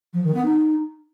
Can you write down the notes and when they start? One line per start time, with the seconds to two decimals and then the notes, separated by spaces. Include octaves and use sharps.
0.13 F3
0.24 D#3
0.34 B3
0.45 D#4